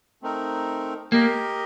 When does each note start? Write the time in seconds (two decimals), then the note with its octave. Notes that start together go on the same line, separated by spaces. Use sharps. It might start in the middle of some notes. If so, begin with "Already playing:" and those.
0.22 A3 C4 D#4 A#4
1.12 A#3 G4 A#4 D#5